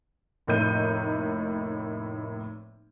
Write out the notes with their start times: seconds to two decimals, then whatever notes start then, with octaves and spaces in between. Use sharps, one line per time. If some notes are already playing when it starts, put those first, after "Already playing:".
0.47 F1 A2 A#3 D#4 G6 D#7